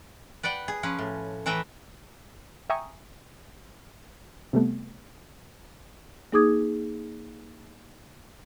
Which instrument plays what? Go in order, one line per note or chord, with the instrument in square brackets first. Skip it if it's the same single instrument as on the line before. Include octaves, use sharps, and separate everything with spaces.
[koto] B4 D5 F#5 G5
G#4
F3 C#4 B4
A2
E3 A3 B4 E5 G5 A#5
[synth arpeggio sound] E5 G5 G#5 A#5 C#6 D#6
C3 G3 A3 B3
[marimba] A#3 D#4 G#4 D6 D#6 G#6